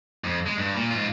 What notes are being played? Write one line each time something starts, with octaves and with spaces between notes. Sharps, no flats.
F2
G#3
G2
A#2
G#2 F4